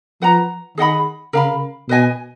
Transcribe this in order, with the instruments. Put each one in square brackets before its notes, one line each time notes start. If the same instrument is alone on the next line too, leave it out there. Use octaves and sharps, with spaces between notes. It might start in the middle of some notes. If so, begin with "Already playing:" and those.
[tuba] F3 [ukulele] B4 F#5 A#5
[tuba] D#3 [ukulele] G#4 D#5 F#5 B5
[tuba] C#3 [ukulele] A#4 F5 B5
[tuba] B2 [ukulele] B4 D#5 G#5